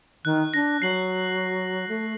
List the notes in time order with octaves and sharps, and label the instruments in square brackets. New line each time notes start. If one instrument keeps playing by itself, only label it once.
[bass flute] D#3 [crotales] F#6
[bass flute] D4 [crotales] A#6
[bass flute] F#3 [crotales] C7 F#7
[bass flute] A3